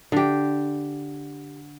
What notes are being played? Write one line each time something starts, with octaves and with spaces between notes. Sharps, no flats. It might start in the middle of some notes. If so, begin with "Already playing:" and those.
D3 G4